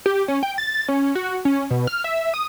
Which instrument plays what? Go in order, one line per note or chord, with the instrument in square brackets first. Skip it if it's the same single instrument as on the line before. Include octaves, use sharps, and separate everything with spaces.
[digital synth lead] G4
C#4
G5
A6
C#4
F#4
C#4
B2
F6
E5
D#6